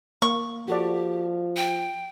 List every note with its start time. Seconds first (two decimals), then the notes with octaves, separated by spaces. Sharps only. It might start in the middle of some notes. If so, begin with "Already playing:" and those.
0.22 A#3 C#6
0.68 F3 F#4 G4 A4 D5
1.56 G5